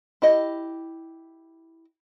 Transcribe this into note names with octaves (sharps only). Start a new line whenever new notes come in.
E4 G4 D#5